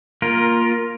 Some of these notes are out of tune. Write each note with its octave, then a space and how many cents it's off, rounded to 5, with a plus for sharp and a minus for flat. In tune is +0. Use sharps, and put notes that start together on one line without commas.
A#3 +0 F4 +0 A#4 +20